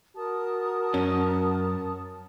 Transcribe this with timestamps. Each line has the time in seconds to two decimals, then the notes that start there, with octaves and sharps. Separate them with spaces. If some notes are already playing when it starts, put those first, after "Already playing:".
0.16 F#4 A#4 A5 D#6
0.94 F#2 C#4